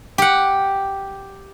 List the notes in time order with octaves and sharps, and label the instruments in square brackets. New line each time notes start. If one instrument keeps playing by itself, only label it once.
[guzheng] G4 F#5